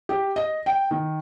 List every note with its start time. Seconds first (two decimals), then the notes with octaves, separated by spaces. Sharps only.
0.09 G4
0.36 D#5
0.66 G5
0.91 D#3